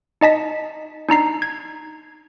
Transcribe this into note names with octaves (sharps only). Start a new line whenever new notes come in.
D#4 D#5 A5 B6
D4 D#4 A#5 C7
G#6